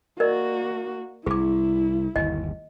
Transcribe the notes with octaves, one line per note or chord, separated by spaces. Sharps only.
A#3 F#4 A#4 D5 D#5
C2 E4 G#4 D6
G1 D#2 D#5